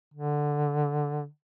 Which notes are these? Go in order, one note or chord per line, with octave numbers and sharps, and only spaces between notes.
D3